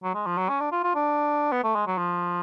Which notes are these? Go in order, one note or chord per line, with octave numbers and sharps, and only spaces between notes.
F#3
G#3
F3
F#3
C#4
D4
F4
F4
D4
B3
A3
G#3
F#3
F3